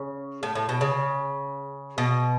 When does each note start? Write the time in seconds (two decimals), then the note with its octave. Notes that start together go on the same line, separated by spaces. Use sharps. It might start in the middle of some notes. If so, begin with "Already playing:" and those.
Already playing: C#3
0.43 A2
0.55 A2
0.69 B2
0.81 C#3
1.98 B2